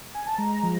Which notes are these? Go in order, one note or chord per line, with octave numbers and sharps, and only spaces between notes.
G#5
A5
G#3 A#5
F3